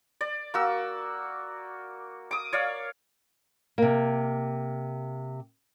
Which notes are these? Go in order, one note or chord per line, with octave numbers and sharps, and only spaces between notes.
D5
A#3 F#4 E6
D6 D#6
C#5 D5 F5
C3 A#3